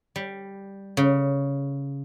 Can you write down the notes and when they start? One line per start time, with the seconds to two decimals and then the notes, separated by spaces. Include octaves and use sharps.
0.16 G3
0.97 C#3